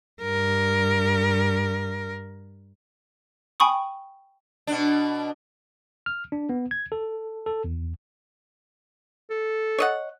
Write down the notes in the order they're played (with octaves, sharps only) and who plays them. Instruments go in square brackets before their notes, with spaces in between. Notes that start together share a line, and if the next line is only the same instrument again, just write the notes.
[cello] G2 A#4
[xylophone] G5 G#5 B5 C#6 D#6
[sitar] B2 D4
[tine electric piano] F6
D4
B3
G#6
A4
A4
E2
[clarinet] A4
[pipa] C#5 D#5 F#5